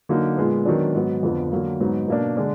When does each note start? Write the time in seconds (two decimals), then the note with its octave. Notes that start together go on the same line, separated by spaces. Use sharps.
0.09 D3 F#3 A#3 D#4
0.38 A#2 G#3 B3
0.66 D#3 F#3 B3 D4
0.95 G#2 F#3 B3
1.23 F2 D3 F3 B3
1.52 D3 F#3 A#3
1.80 G#2 F#3 B3 D#4
2.08 B2 A#3 D4
2.37 D3 G#3 D4